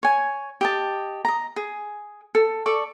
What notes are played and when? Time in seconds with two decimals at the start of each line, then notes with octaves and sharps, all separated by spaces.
0.03 C#5 G#5
0.61 G4 D#5 A5
1.25 D#5 A#5
1.56 G#4
2.35 A4
2.66 A4 D5 C#6